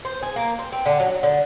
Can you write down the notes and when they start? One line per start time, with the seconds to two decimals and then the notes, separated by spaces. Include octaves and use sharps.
0.05 C5
0.22 G#4
0.36 A#3
0.59 C4
0.72 C4
0.86 D3
1.00 F#3
1.23 D3